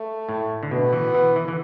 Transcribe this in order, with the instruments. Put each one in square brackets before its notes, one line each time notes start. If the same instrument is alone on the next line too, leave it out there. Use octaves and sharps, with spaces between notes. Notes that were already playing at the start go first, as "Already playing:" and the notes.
Already playing: [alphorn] A3
[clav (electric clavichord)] A2
D3
[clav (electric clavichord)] B2 [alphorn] B3
[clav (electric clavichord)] E3
E3
E3
E3